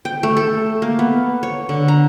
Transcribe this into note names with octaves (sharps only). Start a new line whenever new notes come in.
G5
A3
A4
A#3
B3
C#5
D3
A#5